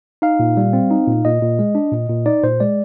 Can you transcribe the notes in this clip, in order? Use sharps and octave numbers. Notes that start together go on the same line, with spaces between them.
D#4 F5
A#2
G3
C4
D#4
A#2
A#2 D#5
A#2
G#3
D4
A#2
A#2
D#4 D5
A#2 C5
G#3 D5